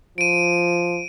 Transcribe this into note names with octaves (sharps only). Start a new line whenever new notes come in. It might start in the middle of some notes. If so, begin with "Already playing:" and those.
F3 D7 D#7